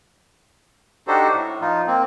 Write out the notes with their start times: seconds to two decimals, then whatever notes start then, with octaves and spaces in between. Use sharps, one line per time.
1.08 D4 D#4 F#4 G4 A4 C5
1.34 A2
1.61 F3 D#4 F4
1.87 A#3 C4